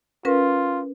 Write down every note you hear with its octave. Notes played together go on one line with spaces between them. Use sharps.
C#4 F4 A#4 B4